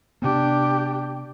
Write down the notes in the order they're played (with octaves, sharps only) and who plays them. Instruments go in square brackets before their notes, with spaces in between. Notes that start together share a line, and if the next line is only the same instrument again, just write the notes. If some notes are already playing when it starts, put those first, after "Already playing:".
[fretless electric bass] C3 B3 [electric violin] D4 G4